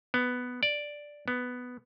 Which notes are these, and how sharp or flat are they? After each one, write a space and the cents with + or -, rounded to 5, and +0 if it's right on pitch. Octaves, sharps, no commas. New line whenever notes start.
B3 +5
D5 +0
B3 +5